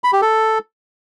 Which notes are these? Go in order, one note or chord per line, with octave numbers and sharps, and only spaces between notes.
B5
G4
A4